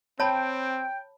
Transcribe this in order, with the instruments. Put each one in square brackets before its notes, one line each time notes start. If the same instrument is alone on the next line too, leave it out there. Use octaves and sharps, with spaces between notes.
[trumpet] C4 [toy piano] C#5 A5 B5 [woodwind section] G5